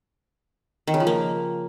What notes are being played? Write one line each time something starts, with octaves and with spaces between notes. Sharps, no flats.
D#3
C#3
F3
A#3